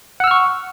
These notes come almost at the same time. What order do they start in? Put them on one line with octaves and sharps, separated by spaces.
F#5 E6 F6 C#6